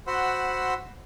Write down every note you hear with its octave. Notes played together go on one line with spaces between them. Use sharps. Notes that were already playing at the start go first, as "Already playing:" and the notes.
F#4 C5 F#5 B5 C6 E6